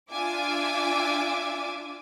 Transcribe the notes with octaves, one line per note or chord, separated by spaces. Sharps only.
D4 F4 E5 G#5 D6